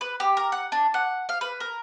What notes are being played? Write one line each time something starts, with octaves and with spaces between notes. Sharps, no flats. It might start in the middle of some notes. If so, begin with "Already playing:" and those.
B4
G4
A#4
F#5
D4
F#5
F5
B4
A#4